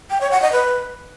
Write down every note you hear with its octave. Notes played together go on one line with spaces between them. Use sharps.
G5
C#5
F#5
D#5
B4